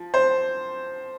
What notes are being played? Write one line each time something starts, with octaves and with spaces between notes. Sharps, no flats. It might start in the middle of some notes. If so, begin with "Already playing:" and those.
Already playing: F3
C5